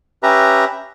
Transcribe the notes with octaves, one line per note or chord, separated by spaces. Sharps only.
C#4 G4 B4 E5 A#5